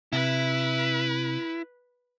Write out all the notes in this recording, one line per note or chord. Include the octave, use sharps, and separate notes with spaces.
C3 E4 B4